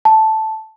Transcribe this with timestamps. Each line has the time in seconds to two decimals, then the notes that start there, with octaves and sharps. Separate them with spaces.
0.05 A5